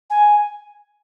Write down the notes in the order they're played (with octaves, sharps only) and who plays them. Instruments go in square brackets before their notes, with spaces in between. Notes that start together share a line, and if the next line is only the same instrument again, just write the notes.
[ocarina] G#5